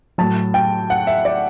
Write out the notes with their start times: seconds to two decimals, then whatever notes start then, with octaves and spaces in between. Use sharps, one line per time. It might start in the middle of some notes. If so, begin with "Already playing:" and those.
0.18 A2 F#3 A5
0.54 G5
0.90 F#5
1.07 E5
1.25 D5